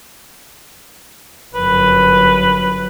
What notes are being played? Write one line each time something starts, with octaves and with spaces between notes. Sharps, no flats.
G1 F#2 B4